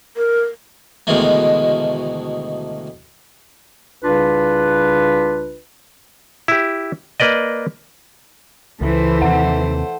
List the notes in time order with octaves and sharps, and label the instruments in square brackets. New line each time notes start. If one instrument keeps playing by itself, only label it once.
[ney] A#4
[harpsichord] D2 B2 D#3 E3 G#3 A3
[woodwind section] C2 C#3 D4 F4 B4
[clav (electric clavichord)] E4 G4
A#3 B4 D5 D#5
[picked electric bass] C#2 [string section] E3 [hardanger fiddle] A3 C5
[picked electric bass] D#2 C3 [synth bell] F#5